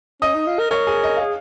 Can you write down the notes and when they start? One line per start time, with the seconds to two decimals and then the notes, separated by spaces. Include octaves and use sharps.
0.22 C#4 D#5 D#6
0.35 D#4
0.47 F4
0.59 A#4
0.71 A#4 C#5 C#6
0.87 G#4 G#5
1.03 D#5
1.17 G#4 F5